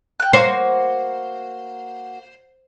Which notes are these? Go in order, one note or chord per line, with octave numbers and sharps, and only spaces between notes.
G5 F#6
A#3 F#4 C5 C6